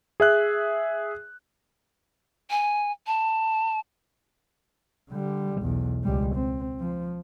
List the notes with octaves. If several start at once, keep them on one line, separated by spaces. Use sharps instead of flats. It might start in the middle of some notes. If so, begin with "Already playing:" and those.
G#4 E5 F#6
G#5
A5
D3 G3
B1 E2
C#2 G3
C4
F3